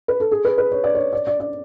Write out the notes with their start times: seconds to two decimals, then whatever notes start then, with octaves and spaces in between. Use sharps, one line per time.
0.08 B4
0.20 A4
0.31 G#4
0.45 B4
0.58 B4
0.72 C#5
0.84 D5
0.95 C#5
1.13 D5
1.27 D5
1.40 D5